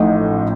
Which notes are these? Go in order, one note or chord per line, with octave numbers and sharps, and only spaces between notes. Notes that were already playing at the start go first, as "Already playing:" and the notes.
Already playing: A1 A2 F3 D#4